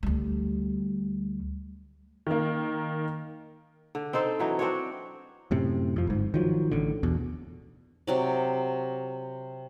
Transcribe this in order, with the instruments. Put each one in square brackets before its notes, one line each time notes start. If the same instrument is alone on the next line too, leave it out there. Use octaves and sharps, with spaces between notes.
[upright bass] D2 G3
[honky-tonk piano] D#3 A#3
[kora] D3
C4 D#4 A4 C5
E3 F#3 D#4
C4 D4 F#4 C#5
[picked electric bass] F#2 A2 C3
F2 F3
G1 G#2
D#3 F3 F#3
A1 A2 D3
E2 B2
[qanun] C3 F#3 D5